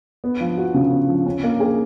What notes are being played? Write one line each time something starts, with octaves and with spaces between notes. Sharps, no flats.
B3
F3
F#4
C#3
B3
F3
C#4
A#3
G#4